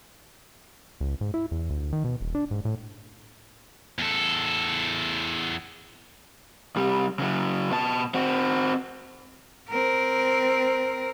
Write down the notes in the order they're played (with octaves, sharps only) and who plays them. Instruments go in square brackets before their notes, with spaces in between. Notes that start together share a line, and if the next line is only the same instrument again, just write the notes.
[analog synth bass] C#2
G#2
E4
E2
D2
D#3
B2
D#1
D4
G#2
A2
[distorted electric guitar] E2 A4
[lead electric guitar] C2 G3
C#3 F#3
B2 A5
C4 F#4
[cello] C4 A#4